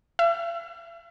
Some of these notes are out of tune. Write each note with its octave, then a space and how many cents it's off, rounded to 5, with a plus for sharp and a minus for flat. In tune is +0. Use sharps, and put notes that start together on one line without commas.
E5 +45